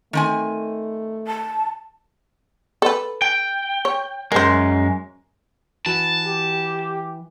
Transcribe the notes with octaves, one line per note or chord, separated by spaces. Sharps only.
D#3 A3 C4 G#5
A5
A4 B4
G5
C#5
F#2 G#3 A#4 C5
E3 F#4 B4 A5
G4